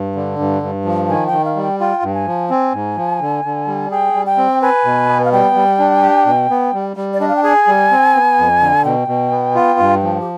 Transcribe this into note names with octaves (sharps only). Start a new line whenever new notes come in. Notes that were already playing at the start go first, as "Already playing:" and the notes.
Already playing: G2
D3
G2
G2
F3
D#3 G#5
G5
D#3
F5
G3
G5
F4 G5
G2
G#5
F3
C4 G#5
G#2
F3
D3
D3
G3
G#4 G5
G3
G5
C4
B4 G#5
B2
B3
F5
G3 G5
G3
D4
G4
B2
B3
G3
G3
D5
D4 D#5
F5
G5
G#4 G#5
G3
C4
B3
F2
D3
B2 G5
B2
B3
F4
G2
F3
G4